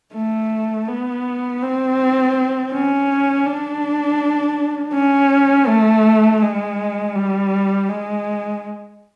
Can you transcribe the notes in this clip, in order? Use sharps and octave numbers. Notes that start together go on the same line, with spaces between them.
A3
B3
C4
C#4
D4
C#4
A3
G#3
G3
G#3